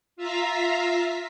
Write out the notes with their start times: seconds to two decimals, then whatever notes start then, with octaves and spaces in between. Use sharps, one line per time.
0.16 F4 E5 F5 A#5 B6